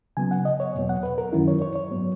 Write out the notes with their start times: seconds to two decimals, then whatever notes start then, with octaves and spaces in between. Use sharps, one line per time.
0.17 C#3 F#3 B3 G#5
0.31 F#5
0.45 D#5
0.60 C#5
0.75 E2 B2 F#3 B3
0.89 F#5
1.03 B4
1.18 A#4
1.33 F#2 D#3 F#3 C#4 E4
1.48 C#5
1.62 C#5
1.75 C#5
1.90 G#2 F#3 B3